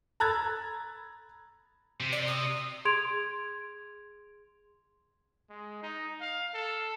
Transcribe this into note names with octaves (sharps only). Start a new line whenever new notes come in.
A#5 B5 E6 F#6 G#6 A6
C3
D5
D#6
G#4 C6 G#6 D7 F7
G#3
D#4
F5
A4